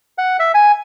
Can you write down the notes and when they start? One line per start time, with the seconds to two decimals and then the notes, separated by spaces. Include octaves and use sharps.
0.18 F#5
0.39 E5
0.55 G#5